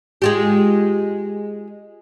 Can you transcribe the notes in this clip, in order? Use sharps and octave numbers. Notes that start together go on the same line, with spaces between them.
G#3 F4 G4